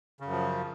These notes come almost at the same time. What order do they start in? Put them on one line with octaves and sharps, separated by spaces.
C#3 F#2 F3